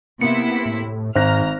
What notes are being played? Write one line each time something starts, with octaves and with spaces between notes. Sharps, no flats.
C3 A#3 B3 E4 C#7
A2
G#1 G#2 C5 A#5 F6 F#6 A#6